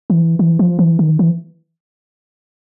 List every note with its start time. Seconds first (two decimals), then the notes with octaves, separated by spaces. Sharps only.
0.10 E3
0.39 E3
0.59 F3
0.79 E3
0.99 D#3
1.19 E3